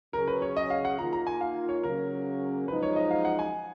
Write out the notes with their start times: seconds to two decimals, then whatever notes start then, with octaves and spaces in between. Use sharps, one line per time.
0.13 C#3 F#3 C#4 G#4 A#4
0.28 B4
0.42 C#5
0.57 D#5
0.70 F5
0.85 F#5
0.98 D#3 A#3 F4 A#5
1.13 A#5
1.27 G#5
1.41 F5
1.69 C#5
1.83 C#3 F#3 A#3 C#4 A#4
2.68 F#2 F3 G#3 D#4 B4
2.83 C#5
2.96 D#5
3.11 F5
3.25 F#5
3.39 G#5